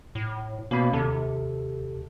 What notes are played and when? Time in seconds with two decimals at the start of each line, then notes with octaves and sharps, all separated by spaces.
0.15 A2
0.71 B2 A#3 C#4 B5
0.93 D#2 C3 A4